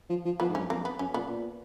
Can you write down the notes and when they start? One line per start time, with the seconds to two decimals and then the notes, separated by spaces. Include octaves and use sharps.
0.09 F3
0.25 F3
0.40 F3 B3
0.49 G#2
0.55 F#2 C#4
0.70 F2 A#3
0.85 B3
0.99 F#2 C#4
1.14 A#2 B3
1.29 A#2